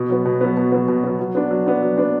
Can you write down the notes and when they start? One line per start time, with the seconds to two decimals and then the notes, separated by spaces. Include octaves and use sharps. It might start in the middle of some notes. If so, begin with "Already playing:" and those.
Already playing: B2
0.09 F#3 B3
0.25 B2
0.41 F#3 B3
0.57 B2
0.72 F#3 B3
0.88 B2
1.04 F#3 B3
1.19 F#3
1.35 B3 D4
1.51 F#3
1.66 B3 D4
1.82 F#3
1.98 B3 D4